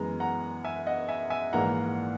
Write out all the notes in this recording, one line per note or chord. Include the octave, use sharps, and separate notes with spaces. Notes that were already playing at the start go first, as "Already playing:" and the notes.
Already playing: F#2 E3 G#3 B3 A#5
F#5 A#5
E5 G#5
D#5 F#5
E5 G#5
E5 G#5
A#1 G#2 E3 A#3 F#5 A#5